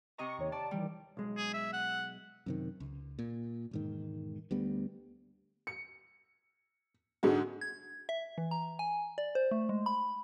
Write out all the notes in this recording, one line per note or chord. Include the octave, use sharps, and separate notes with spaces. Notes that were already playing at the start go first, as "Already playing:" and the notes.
C3 D#5 A#5 C#6
D#2 D#3 C#5
D5 A5
D#3 E3 G3
B1 G#3
G#4
E5
F#5
F#2 C3 D#3
C#2
A#2
E1 G#2 D#3
D2 G3 B3
C#7
G#2 D3 G#3 F#4
G#6
E5
E3
A#5
G#5
D5
C5
A3
G#3
B5